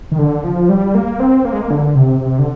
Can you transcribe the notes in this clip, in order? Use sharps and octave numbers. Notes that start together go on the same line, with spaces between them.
D#3
D3
F3
G3
A#3
C4
A#3
G#3
A#3
D3
C3
C3
D3